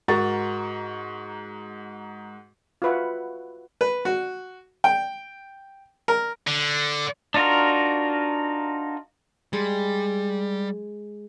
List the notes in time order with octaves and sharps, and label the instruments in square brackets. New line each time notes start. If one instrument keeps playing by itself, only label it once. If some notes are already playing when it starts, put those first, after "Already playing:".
[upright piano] G#2 F#4 A#4 A#5 C#6 A6
[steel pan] F4 F#4 B4 E5 F#5
[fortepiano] B4
F#4
G5
A#4
[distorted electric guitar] D3
[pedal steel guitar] D4 D#4 F4 F#4 A#4
[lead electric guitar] G3 [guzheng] G#3